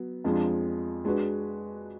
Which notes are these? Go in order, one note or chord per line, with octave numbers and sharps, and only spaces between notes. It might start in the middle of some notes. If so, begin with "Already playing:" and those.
Already playing: F#3 B3
F2 F3 G#3 D4
G#3 D4 F#4 B4